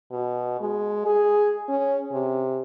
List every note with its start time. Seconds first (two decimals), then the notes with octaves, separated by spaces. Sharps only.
0.11 B2
0.61 G#3
1.06 G#4
1.69 C#4
2.12 C3